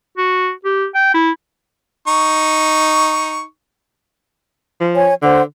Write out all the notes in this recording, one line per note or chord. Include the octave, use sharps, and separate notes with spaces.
F#4
G4
G5
E4
D#4 C#6
F3
C#5 G#5
D3 C5 F#5